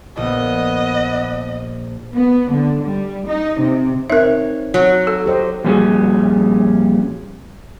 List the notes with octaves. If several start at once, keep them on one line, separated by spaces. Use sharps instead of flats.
A#1 B3 D#5
B3
D3
G3
D#4
C3
C4 D#4 A#4 C#5 E5
F#3
A4
G4 C5 D#5
F2 A#2 G3 C#4 F#4 G#4